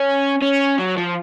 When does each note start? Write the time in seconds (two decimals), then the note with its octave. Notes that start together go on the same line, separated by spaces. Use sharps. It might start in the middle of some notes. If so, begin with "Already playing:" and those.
Already playing: C#4
0.42 C#4
0.79 F#3
0.97 F3